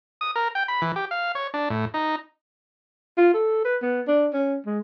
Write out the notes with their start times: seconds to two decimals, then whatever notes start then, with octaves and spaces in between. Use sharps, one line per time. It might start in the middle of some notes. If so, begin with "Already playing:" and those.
0.21 D#6
0.36 A#4
0.55 G5
0.68 B5
0.82 E3
0.96 G4
1.11 F5
1.35 C#5
1.54 D4
1.70 A2
1.94 D#4
3.18 F4
3.34 A4
3.65 B4
3.82 B3
4.08 D4
4.34 C#4
4.66 G#3